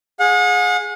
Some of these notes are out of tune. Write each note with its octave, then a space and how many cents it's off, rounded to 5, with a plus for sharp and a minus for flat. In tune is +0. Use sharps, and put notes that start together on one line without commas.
G#4 +0 F#5 -40